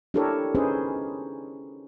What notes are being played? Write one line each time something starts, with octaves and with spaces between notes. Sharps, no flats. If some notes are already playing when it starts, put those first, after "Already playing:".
D4 E4 G4 A4 A#4 C#5
C#4 D#4 G#4 B4 C5